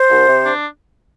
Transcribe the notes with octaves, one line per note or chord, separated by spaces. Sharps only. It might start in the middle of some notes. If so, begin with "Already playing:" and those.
Already playing: C5
C2
C3
D4